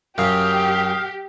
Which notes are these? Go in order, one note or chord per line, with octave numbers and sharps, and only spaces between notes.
F#2 G4 F5 D#6